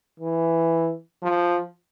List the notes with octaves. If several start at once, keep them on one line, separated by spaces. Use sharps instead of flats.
E3
F3